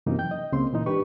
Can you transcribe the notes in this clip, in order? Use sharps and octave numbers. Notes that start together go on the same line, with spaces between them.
F#2 C3 E3 A#3 D#4
G5 G6
D#5
C#2 C#3 A#3 C4 C6
A#2 E3 D#4
G#2 D4 G4 B4 C#6